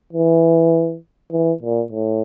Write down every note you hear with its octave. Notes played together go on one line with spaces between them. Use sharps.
E3
E3
A#2
A2